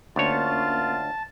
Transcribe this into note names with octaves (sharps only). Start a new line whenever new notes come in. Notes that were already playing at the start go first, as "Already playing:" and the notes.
D2 A#3 C#4 F4 A#4 C#5 A5